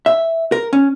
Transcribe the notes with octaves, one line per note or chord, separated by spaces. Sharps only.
E5
A#4
C#4